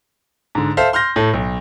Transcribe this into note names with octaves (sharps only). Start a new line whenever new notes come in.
G#2 D3
A4 C5 E5 F5
C6 F6 G6 A#6
A2 A4
B1